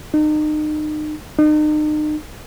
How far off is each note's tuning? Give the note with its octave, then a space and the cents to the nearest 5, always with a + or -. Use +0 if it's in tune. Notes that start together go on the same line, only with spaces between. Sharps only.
D#4 -35
D#4 -40